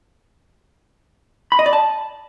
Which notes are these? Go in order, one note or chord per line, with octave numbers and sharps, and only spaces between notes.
B5
D#5
D5
A5